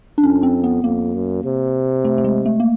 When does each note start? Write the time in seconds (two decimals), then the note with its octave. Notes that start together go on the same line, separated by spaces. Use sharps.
0.18 D4
0.23 F2 C#4
0.43 C4
0.64 B3
0.83 F2 A#3
1.14 F#2
1.45 C3
2.05 A3
2.18 A3
2.24 G#3
2.46 A3
2.60 A#3